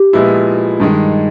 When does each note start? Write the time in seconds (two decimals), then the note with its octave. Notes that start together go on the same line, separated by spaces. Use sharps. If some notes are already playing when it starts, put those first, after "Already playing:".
Already playing: G4
0.13 A#2 F3 G#3 B3 E4
0.80 G2 D#3 G#3